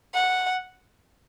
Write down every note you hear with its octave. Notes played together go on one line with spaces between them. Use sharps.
F#5